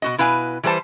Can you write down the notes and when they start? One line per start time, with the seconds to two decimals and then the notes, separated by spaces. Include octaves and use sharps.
0.02 B2 F#4 D#5
0.18 B2 E4 B4 F5 G#5
0.63 E3 G3 B4 C5 A5